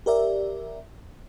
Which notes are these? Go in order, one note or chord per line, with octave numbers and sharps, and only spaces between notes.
G4 A#4 D5 E5